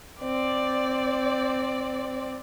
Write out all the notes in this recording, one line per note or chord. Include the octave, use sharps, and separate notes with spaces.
C4 D5